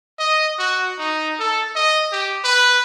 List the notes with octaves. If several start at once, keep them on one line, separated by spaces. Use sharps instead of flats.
D#5
F#4
D#4
A4
D#5
G4
B4